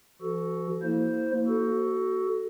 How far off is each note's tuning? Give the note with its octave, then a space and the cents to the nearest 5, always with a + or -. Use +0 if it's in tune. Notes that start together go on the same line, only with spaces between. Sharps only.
F3 -40 F#4 +10 A4 +0
A#3 +0 E4 -20 C5 +0
F#4 +20 A4 +0